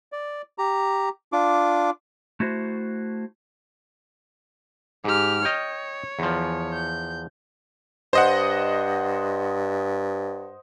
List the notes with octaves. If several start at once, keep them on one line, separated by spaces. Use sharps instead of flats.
D5
G4 A#5
D4 F4 D6
A3 E4 F#4 C5
G#2 G4 F6
C#5 D#5 G5
E2 F3
G6
G2 C5 D#5 F#5